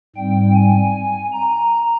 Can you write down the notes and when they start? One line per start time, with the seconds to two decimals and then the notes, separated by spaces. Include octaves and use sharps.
0.16 G#2 G3 C4 G5
0.55 G#5
1.32 A#5